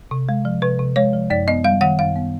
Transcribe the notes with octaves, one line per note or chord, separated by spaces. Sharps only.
C3
G#3
F3
C3 B4
C3
G#3 C#5
F3
F#2 D5
B3 D#5
G3 F5
D#3 F#5
F#2 F5
B3